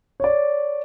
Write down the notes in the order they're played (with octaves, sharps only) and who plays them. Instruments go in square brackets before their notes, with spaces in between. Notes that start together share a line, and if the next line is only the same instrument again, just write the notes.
[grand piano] C#5 D5